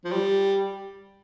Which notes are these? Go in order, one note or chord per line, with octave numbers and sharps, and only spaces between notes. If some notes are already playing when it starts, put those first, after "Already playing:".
F3
G3